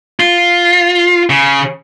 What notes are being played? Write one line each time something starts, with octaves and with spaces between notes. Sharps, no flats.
F4
C#3